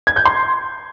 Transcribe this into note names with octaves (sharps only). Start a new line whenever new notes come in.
G#6
G6
C6